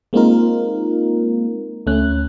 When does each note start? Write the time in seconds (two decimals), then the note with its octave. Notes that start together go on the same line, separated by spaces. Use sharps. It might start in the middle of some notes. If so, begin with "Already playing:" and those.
0.13 G#3 A#3 C4 D#4 F4 A#4
1.86 D2 A3 C#4 F#6